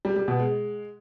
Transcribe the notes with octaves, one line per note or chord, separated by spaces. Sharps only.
G3
G3
B2
G#3